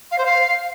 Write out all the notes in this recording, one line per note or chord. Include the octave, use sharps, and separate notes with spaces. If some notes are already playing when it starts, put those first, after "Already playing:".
F5
C5
F5